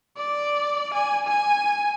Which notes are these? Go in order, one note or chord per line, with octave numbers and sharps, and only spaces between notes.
D5
G#5
G#5